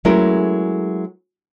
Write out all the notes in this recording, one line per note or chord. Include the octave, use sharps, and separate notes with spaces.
F#3 G#3 A3 C#4 E4 A#4